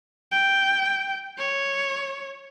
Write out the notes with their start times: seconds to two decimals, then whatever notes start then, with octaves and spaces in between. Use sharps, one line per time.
0.31 G5
1.38 C#5